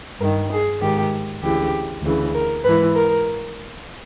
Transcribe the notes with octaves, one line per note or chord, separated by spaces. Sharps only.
G2 D#3 A#4
G#4
G#2 D#3 G4
D2 C#3 E3 G4
D2 C#3 E3
A#4
G#2 E3 B4
A#4